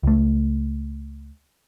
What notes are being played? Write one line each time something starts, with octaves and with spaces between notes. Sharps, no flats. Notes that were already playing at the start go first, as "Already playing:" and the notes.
C#2 A3